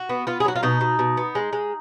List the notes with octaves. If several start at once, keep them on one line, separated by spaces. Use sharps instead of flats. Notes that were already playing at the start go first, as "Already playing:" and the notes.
Already playing: F#4
B3
B3 F4
G#4
F#3 F#4
F4
B2 D#4
B2
B2
B3
G#3
G#3